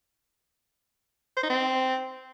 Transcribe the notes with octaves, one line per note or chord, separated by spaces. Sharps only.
C5
D#4
C4